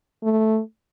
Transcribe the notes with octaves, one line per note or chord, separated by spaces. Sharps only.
A3